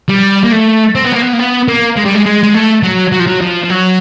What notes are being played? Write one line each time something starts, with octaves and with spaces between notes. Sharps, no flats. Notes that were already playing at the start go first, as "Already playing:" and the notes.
G3
A#3
A3
C4
B3
A#3
B3
A#3
B3
A#3
G#3
G3
G#3
G#3
G#3
A3
F#3
F#3
F3
F#3
F3
F3
F#3